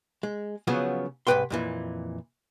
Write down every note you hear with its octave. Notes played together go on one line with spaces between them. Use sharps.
G#3
C#3 F3 F#3 B3 C#4
C2 G#2 E3 B4 G5 C6
F2 A#2 E3